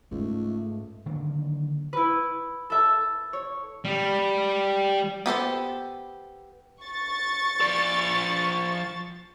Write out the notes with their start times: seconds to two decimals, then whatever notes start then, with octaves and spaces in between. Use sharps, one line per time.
0.11 C#2 G#2 A3
1.06 D3 D#3 F#3 A#3
1.93 E4 B4
2.70 A4 E5 A5
3.33 C#5
3.85 G3
5.26 B3 G4 A4 C5
6.83 C#6 A6
7.61 F3 D5